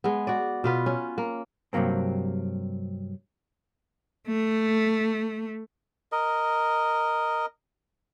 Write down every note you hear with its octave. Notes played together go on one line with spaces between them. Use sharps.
G#3 B3
F#4 D5
B2 F4 B4
C#4
A#3
G2 C3 F#3 A#3 C4
A3
A#4 D#5